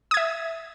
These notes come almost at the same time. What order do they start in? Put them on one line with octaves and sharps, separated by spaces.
D#6 G#6 E5